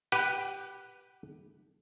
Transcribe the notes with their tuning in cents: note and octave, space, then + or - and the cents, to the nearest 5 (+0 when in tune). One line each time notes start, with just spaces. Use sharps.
G4 +0 B4 +0 F#5 +35